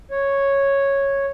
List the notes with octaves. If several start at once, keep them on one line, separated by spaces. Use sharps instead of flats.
C#5